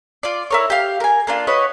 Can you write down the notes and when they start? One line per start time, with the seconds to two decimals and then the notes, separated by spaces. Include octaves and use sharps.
0.23 F4 D5
0.50 E4 A#4 C#5
0.70 G4 F5
1.00 A#4 G#5
1.27 A#3 D4 F4
1.47 F#4 B4 C#5 D#5